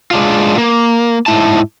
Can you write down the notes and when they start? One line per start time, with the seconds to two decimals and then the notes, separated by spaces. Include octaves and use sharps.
0.11 G#3 D4 F4
0.58 A#3
1.26 G#2 E4 A5